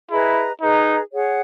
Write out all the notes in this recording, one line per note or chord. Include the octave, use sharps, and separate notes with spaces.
E4 G#4 B4 D#5 A#5
D#4 G#4 B4 D#5 A#5
G#4 C#5 F#5